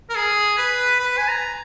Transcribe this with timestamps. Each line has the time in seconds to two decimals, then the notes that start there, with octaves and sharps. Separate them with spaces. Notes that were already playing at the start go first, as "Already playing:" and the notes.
0.10 A#4
0.15 G#4
0.57 B4
0.99 B4
1.17 G#5
1.28 A#5